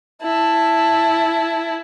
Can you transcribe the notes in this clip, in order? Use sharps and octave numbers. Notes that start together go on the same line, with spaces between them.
E4 A5